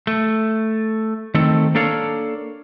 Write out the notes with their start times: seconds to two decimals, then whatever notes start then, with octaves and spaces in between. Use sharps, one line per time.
0.07 A3
1.35 D#3 A3 C4 A4
1.75 A#3 D4 A4 C#5 F5